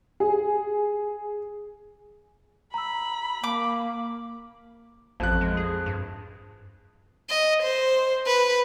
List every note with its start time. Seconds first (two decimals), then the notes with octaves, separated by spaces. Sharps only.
0.20 G#4
2.74 A#5 B5 E6
3.44 A#3 D6
5.20 A1 F2 F#6
5.41 G#3
5.57 G#4
5.86 G2
7.29 D#5
7.62 C5
8.26 B4